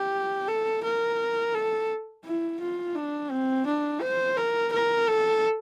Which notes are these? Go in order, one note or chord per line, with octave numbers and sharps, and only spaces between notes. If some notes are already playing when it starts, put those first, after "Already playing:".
Already playing: G4
A4
A#4
A4
E4
F4
D4
C4
D4
C5
A#4
A#4
A4